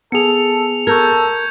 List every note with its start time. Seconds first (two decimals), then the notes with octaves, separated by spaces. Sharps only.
0.12 B3 G#4 A4 C#7 F7
0.87 A4 A#4 C#6 G6 G#6